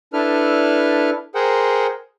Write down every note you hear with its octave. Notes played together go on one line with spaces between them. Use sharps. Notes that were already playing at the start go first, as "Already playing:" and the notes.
D4 E4 A4 B4 F6
G#4 A#4 C5 F#5 G5